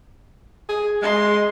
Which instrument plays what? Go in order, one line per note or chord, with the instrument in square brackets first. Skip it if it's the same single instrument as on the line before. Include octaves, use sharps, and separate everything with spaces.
[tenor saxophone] G#4
[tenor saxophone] G#3 [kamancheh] D#5 C6